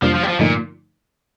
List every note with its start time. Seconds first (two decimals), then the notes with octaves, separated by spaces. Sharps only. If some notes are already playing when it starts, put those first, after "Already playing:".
0.02 F2 C3 F3 G3 A#3 D4
0.14 F3
0.23 G3
0.27 F3
0.39 G2 A#2 D3 F3 A3 D#4